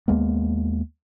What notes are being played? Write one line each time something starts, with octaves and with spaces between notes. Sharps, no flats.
D#2 G#3 A#3 B3